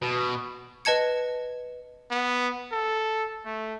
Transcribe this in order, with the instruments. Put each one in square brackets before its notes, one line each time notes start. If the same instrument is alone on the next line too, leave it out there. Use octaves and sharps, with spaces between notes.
[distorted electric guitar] B2
[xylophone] B4 D#5 A5 G#6 C#7
[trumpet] B3
A4
A3